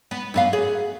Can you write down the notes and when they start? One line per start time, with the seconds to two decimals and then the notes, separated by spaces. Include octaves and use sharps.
0.11 B3
0.34 F#2 B3 F5
0.53 G#4